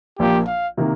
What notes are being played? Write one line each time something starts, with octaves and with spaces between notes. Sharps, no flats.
A#1 A#2 F3 A#3 G4
F5
C3 D#3 A#3